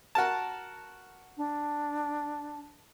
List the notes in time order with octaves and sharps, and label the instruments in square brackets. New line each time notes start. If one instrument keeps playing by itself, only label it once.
[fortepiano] F#4 A#4 A5
[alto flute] D4